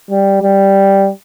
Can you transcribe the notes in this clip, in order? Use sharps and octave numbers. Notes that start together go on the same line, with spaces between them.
G3
G3